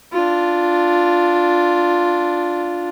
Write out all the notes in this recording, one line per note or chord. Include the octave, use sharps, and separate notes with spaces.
D4 F4